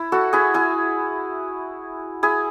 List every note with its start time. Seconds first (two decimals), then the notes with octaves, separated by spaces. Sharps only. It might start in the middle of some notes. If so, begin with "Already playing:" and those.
Already playing: E4
0.12 F#4 A4
0.33 E4 G#4
0.54 E4 G#4
2.23 E4 G#4